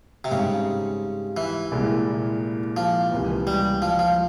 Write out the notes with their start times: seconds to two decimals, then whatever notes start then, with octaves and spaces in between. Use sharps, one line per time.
0.24 C3
0.31 G#2 C#3 G3 C4
1.37 E3
1.72 C2 A#2 G#3 E4
2.77 F3
3.12 C#2 C3 E3 A#3
3.47 G3
3.82 F3
3.99 F3